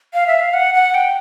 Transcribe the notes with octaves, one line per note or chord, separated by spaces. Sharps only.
F5
E5
F5
F#5
F#5
G5